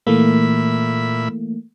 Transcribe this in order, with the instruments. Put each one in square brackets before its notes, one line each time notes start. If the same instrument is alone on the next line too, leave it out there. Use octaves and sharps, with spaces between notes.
[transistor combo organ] A#2 E5 B5 [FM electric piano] E3 A3 A#3